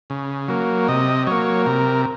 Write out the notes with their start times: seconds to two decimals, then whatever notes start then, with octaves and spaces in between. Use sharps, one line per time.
0.10 C#3
0.48 F#3 A#3
0.88 C3 D#5
1.27 F#3 A#3 C#5
1.66 C3 A#4